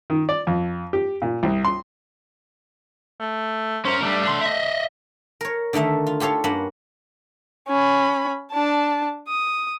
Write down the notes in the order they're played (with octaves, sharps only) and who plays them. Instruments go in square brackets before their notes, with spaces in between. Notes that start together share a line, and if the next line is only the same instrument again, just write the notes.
[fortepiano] D#3
D5
F2
G4
A#2
C2
C6
[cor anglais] A3
[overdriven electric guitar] C#4 A#4 [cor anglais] C5
[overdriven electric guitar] G3 D4 [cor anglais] A3
[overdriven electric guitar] D4 C6
D#5 E5
[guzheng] A#4 C#5
D3 D#3 A3 D#4 E5
F4
F4 G4 A4 C#5 F5
G2 A#3 C#4 F#5 B5
[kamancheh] C#4 B5
D4 A5
D#6